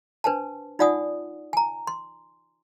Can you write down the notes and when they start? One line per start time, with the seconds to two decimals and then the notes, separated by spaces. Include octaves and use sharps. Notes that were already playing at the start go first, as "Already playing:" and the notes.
0.24 D4 B4 C5 G#5 A5
0.79 D#4 F4 D5 F#5 G#5 D#6
1.53 G#5 A#5
1.87 C6